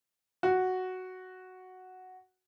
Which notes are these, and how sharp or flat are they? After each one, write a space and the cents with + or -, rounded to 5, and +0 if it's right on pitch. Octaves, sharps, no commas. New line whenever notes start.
F#4 +0 F#5 +0